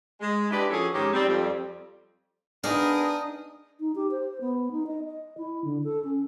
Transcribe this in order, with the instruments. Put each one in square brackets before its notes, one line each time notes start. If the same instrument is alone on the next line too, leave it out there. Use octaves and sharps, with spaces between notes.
[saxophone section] G#3
D4 E4 G4 B4 D5 D#5
F3 C#4 F#4 G#4 A4
G#2 D#3 C#4 G4
G3 C4
F2 G3
[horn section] B3 G#4 A#4 [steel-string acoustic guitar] D4 [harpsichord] D#4 F5 [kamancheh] D#6
[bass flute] D#4
G4
C5
B3
D#4
D#5
D#5
E4
D3
A4
C#4